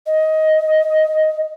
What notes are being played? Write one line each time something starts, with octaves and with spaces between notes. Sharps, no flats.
D#5